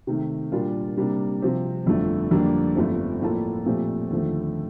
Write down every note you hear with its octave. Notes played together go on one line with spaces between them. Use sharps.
C3 D#3 A3
A#2 G3 D4 F4 A#4
C3 G3 A#3 D4
C3 F3 C4 G4
G1 F2 D3 F3 A3
F2 D3 G3 A#3 D4
G1 G2 F3 A3 C4
A2 F3 A#3 F4 A4
A#2 F3 A3 C4 G4
D#2 D3 F3 A3